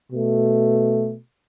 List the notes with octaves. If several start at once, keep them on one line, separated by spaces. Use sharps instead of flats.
B2 A3